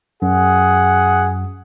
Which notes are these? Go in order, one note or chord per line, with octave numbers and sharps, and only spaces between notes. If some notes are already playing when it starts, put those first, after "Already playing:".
F#2 G#4 F#5